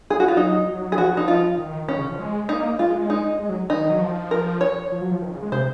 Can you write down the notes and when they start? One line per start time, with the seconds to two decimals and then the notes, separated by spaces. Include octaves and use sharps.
0.10 G#4
0.20 F#4
0.28 F4
0.37 F#3 D#4
0.67 F#3
0.92 G#4
0.98 F3 F#4
1.17 D#4
1.28 F4
1.58 D#3
1.88 D#3 C#4
1.99 C#3
2.09 F3
2.18 G#3
2.45 G#3
2.49 A#3 D#4
2.79 G#3 F4
3.10 D#4
3.39 G#3
3.49 F#3
3.70 D#3 D#4
3.90 F#3
4.01 F3
4.31 A#4
4.61 C#5
4.92 F3
5.01 F#3
5.11 F3
5.22 D#3
5.31 C#3
5.42 G#3
5.52 C3 C5